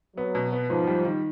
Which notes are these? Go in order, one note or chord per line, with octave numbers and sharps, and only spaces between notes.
F#3 B3
B2
B3
G#2 F3
G3
D#3